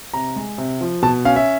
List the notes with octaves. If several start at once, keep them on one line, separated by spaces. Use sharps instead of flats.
C3 A#5
G#3
C3
F3
B2 A5
C#4 F5
E5